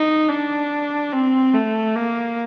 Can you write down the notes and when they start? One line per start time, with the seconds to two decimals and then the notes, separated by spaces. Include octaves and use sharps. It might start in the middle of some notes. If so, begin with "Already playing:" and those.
Already playing: D#4
0.29 D4
1.12 C4
1.53 A3
1.95 A#3